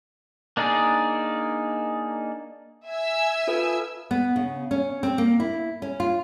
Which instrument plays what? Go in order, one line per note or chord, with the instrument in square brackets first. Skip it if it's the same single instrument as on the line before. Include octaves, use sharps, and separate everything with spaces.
[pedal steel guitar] A#3 D4 D#4 G#4 D5
[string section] E5 G#5 E6
[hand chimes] F4 A4 B4
[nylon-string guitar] B3
C#3
C#4
C4
A#3
E4
C#4
F4